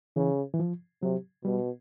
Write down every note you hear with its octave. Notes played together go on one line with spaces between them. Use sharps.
C#3 E3
E3
F3
C3 F#3
B2 G3